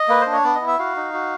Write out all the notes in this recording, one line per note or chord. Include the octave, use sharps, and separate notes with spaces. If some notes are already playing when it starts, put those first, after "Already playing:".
Already playing: D#5
A#3 B4
C5
D4
C#5
B3 D5
D#5
E4
E5
F#4 F5
D#4
F#4